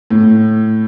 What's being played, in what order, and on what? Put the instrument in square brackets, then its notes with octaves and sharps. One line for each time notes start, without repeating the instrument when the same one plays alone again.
[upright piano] A2